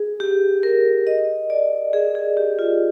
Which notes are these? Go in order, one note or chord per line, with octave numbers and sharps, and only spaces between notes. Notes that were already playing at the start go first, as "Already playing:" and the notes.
Already playing: G#4
G4
A#4
D#5
D5
G#4
G#4
G4
F4